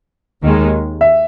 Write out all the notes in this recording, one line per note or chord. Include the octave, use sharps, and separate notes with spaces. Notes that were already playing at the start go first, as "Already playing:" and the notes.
D#2 D#3 G#3
E5